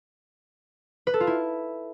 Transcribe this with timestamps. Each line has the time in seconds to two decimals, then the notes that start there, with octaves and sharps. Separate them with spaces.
1.07 B4
1.14 A4
1.20 F4
1.27 E4